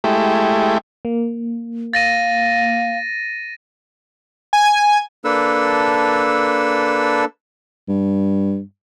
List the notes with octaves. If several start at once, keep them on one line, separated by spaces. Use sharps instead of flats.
G#3 A3 E4 G4
A#3
F5 A6 A#6 D#7
G#5
A#3 D4 A4 B4 E6
G2